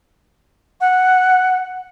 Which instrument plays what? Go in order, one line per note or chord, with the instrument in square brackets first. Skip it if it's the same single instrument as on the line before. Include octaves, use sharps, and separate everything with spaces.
[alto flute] F#5